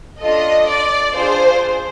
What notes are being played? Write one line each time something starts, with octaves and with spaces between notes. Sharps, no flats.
D4 F4 A4 D#5
D5
D4 F4 G#4 C5